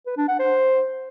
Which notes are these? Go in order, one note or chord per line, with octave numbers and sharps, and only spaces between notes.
B4
D4
F#5
C5